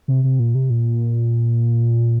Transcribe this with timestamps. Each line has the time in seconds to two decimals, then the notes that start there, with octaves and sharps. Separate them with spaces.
0.08 C3
0.24 C3
0.39 A#2
0.55 C3
0.70 A#2